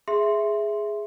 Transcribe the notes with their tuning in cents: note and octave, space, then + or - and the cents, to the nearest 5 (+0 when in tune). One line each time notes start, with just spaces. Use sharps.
G#4 +0 E5 +0 C6 +0